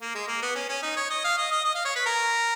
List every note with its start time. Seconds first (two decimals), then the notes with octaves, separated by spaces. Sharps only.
0.01 A#3
0.15 G#3
0.28 A#3
0.42 B3
0.55 C#4
0.69 C#4
0.83 D#4
0.97 C#5
1.10 D#5
1.24 F5
1.38 D#5
1.51 D#5
1.65 D#5
1.75 F5
1.85 C#5
1.96 B4
2.06 A#4